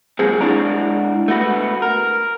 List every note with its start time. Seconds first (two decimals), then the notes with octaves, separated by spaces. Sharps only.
0.19 F3 F#3 G#3 A#3 C4 G#4
0.41 G#3 D4 E4 F#4 D5 A#5
1.28 A3 B3 F#4 B4
1.82 A#4